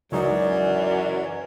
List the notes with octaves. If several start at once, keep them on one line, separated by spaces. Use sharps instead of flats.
C#2 F#2 E3 F#3 D#4 C#5 D5